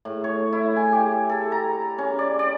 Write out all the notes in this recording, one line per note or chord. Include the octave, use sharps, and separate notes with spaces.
A2
C#5
E4
G#5
G4
A4
A#5
C#4
D5
D5